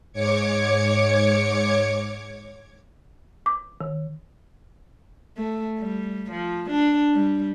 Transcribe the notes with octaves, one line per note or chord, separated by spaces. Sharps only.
G#2 C#5 D6 G#6 C#7
D6
D#3
A3
G3
F3
D4
G3